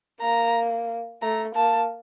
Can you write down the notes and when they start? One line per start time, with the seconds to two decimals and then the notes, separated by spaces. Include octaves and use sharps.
0.21 A#3 A#5
1.22 A3 A#5
1.56 A#3 A5